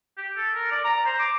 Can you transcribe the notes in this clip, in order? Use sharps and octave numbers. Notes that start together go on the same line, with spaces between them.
G4
A4
A#4
D5
A#5
C5
D6